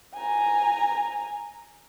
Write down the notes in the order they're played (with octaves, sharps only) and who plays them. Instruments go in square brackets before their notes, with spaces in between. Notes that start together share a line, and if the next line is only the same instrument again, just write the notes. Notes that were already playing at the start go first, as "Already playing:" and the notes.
[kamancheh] G#5 A#5